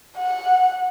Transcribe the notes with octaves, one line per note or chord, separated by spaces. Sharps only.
F#5